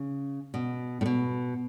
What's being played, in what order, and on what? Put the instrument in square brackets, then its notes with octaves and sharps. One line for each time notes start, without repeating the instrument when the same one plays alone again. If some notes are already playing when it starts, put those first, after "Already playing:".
Already playing: [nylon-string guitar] C#3
B2
A2
B2